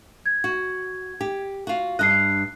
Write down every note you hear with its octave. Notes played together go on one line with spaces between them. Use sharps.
G#6
F#4
G4
F4 F#4
G2 D#5 F#6 C7